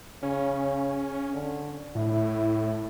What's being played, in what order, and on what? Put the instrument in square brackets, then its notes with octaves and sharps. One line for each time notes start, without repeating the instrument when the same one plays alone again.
[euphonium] C#3 [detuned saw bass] C#4
[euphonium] D3
[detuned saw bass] A2 [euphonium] E4